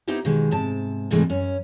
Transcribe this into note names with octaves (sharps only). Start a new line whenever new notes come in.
B3 D#4 E4 G4 C5
B2 D#3 G#3
G#2 C3 A5
G#2 C3 E3 G#3 A3 D4
F#2 C#4